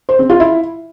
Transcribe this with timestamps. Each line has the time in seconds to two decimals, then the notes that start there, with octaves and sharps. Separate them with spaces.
0.09 C5
0.19 C4
0.30 F4
0.40 E4